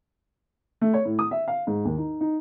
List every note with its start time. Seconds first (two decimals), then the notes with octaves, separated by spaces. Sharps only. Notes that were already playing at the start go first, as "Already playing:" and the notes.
0.82 A3
0.94 C#5
1.05 A2
1.19 D#6
1.31 E5
1.48 F5
1.67 G#2
1.85 D#2
1.98 D#4
2.21 D#4